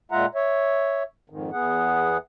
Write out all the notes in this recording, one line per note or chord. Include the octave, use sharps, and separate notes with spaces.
A#2 G#3 F4 E5 F#5 A#5
C#5 E5
F2 G#2 D#3
E2 B3 G#4 F#5